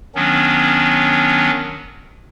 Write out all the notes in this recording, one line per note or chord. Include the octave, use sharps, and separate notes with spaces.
D#3 F#3 B3 C#4 D4